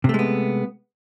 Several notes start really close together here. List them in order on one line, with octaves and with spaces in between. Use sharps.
C3 A3 G#3 B3